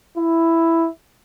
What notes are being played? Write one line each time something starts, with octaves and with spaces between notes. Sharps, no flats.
E4